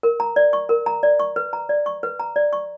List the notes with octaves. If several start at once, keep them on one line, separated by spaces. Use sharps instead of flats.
A#4
A#5
D5
C#6
A#4
A#5
D5
C#6
B4
A#5
D5
C#6
B4
A#5
D5
C#6